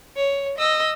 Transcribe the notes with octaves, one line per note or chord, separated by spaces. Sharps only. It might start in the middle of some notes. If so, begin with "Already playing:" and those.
C#5
D#5 E6